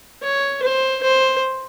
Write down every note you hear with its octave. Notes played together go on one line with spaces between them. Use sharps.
C#5
C5
C5